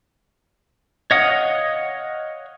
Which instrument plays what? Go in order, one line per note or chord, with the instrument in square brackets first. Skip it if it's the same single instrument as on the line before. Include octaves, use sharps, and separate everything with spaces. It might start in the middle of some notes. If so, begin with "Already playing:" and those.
[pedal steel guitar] C#5 D#5 F5 F#5 D#6